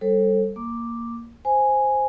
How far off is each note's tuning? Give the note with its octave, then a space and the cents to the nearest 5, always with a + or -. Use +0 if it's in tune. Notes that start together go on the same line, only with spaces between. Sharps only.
G3 +0 A4 +15 C5 +40
A#3 +0 D6 +0
C5 +0 G#5 +0